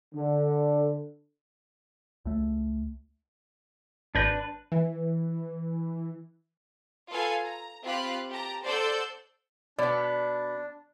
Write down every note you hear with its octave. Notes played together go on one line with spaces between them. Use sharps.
D3
C#2 A3
G#1 D4 B4 G6 A#6
E3
F4 A4 B4 F5 G#5
A#5
C4 F4 G4 F5 B5 F#6
G4 A5 A#5
A4 C5 D5 F#5 E6 G6
B2 B3 D4 D5